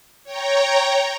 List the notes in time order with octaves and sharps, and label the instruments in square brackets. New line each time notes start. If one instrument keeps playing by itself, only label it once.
[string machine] C#5 G5 A#5